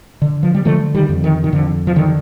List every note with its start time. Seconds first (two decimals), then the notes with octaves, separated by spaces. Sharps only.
0.22 D3
0.43 F3
0.55 G3
0.65 D3 F3 A3
0.95 D#3 G3
1.09 F2
1.24 D#3
1.44 D#3
1.52 F2 D3
1.87 F3
1.96 D3 D#3